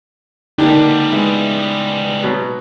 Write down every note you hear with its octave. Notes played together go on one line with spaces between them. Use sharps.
C#2 D3 G3 A#3 D4 D#4 G4
G#3 B3 E4
B2 F#3